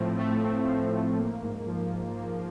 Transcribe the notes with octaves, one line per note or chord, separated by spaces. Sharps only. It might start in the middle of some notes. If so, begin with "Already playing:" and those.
Already playing: A2 F3 A3 C4
A3
C4
F3
A2
A#3
G#2
F3
G#2
A#3